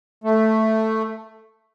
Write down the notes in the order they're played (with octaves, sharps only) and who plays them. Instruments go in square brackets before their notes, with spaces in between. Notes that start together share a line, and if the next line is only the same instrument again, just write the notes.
[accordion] A3